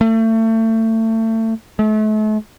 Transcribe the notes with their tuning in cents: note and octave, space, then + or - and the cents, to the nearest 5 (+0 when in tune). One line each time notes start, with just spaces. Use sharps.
A3 +30
A3 -40